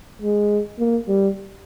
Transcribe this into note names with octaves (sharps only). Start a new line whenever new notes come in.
G#3
A#3
G3